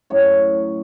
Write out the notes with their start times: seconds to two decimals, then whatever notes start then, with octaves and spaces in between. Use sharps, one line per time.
0.10 F#2 A2 C#5